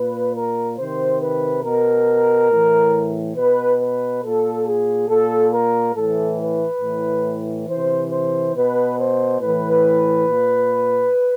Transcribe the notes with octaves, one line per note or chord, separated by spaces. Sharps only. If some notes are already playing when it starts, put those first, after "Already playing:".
Already playing: A#2 B4
A#4
C3 D#3 C5
B4
B2 A#4
A2 E3
B2 B4
B4
A#2 A4
G#4
A#2 A4
A#4
A2 E3 A4
B4
A2 E3
C3 E3 C5
C5
B2 B4
C5
A2 E3 B4
A#2